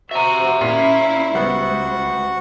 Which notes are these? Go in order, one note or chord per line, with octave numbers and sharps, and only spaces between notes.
F#4 C5 E5 A#5
A#2 C#4 E4
C#2 G3 B3 F#4 C5 F#5